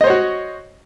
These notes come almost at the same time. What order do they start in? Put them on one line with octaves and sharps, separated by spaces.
D#5 C5 C#5 F#4